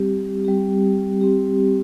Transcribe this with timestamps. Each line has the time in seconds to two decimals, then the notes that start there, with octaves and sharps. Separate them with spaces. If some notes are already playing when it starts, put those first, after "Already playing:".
Already playing: G3 C4 G4
0.45 G3 C4 G4
1.21 G3 C4 G4